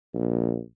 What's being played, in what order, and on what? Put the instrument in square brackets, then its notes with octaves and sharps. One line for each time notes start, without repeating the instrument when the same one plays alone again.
[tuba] A#1